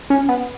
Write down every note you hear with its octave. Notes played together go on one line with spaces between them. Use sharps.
C#4
B3